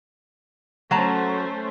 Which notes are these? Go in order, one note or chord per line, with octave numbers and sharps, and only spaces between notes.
F#3 A3 C#4 C5 A5 A#5